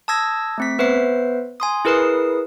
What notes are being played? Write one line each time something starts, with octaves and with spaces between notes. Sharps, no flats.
A5 D#6 E6 G#6 A#6
A3 C4 B6
B3 B4 C5 E5 C7
G#5 C6 D#6
E4 G#4 A#4 B4 D#6 C7